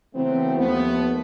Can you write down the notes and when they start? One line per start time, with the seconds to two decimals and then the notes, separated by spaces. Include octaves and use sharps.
0.15 C#3 E3 F#3 A3 B3 C4
0.58 D#2 F3 A3 B3